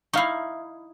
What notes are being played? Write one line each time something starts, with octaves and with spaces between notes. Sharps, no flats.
D#4 E4 F5 C#6